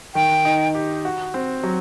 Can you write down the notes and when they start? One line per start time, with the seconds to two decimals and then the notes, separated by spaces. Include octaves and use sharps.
0.15 D#3 G5
0.45 D#4
0.75 G4
1.05 F#4
1.34 C4
1.63 F#3